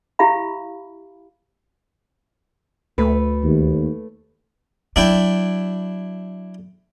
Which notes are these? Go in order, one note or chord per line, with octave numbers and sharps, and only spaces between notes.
E4 G4 E5 F5 B5
D2 A3 B4
D#2
F#3 D4 E4 G5